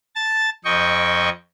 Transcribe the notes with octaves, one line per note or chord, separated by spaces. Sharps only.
A5 A6
F2 D#5 G5 C#6